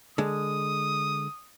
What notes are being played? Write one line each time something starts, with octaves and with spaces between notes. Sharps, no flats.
D3 G#3 D#6